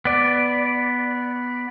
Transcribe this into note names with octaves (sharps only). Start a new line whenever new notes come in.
B3 D5